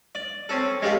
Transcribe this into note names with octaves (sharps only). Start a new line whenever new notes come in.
D5
C4 C#4 A4
G#3 C#4 G4 A4 F5